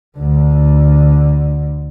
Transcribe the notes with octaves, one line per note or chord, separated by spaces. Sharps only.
D2 D3